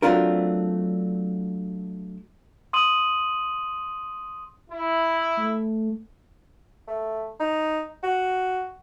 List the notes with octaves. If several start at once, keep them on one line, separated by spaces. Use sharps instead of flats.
F#3 A3 C4 D4 F4 A#4
C6 D#6 D#7 F#7
E4
A3
A3
D#4
F#4